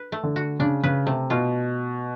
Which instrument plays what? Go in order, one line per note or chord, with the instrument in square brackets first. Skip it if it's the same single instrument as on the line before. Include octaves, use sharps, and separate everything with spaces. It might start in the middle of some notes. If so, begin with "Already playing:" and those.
Already playing: [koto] B4
A3
[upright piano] D3
[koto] F#4
[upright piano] C#3 [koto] D4
[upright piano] C#3 [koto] B4
[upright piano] C3 [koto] A3
[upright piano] B2 [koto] F4